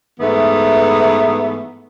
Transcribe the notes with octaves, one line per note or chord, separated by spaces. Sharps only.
G#2 E3 A3 B3